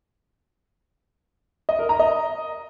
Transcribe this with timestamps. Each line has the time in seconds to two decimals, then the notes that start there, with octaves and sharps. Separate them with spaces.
1.69 D#5
1.79 A#4
1.89 A#5
1.99 D#5